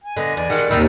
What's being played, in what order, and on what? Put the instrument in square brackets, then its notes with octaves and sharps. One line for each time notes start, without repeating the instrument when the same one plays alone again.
[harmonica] G#5
[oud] D3 B3 [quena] D#5
[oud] E2 [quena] D5
[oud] D#3 [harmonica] G3 G#3 F#5
[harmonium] D#2 [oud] C3 D#3 [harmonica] B5 E6